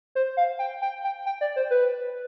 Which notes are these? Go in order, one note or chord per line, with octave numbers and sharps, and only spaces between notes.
C5
F5
G5
G5
G5
G5
D5
C5
B4